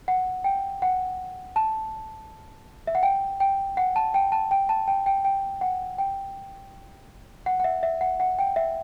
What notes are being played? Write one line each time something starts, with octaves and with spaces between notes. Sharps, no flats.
F#5
G5
F#5
A5
E5
F#5
G5
G5
F#5
A5
G5
A5
G5
A5
G5
G5
G5
F#5
G5
F#5
F#5
E5
E5
F#5
F#5
G5
E5